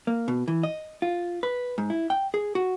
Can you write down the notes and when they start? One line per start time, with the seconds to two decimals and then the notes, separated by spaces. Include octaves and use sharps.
0.07 A#3
0.28 B2
0.48 E3
0.63 D#5
1.02 F4
1.43 B4
1.78 G#2
1.90 E4
2.10 G5
2.34 G#4
2.55 F#4